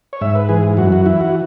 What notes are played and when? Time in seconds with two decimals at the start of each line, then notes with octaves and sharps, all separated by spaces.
0.13 C#5
0.21 G#2 E5
0.35 B4
0.49 E3 G#4
0.77 F#2 F#4
0.92 F#4
1.06 E3 E4
1.21 F#4